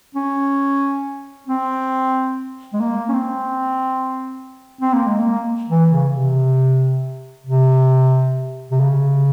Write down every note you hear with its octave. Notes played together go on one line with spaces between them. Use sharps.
C#4
C4
G#3
A#3
C#4
C4
C4
A#3
G#3
A#3
E3
C#3
C3
C3
C3
C#3